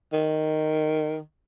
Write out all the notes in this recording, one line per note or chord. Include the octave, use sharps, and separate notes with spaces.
D#3